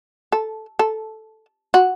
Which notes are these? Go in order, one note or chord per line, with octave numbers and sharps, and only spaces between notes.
A4
A4
F#4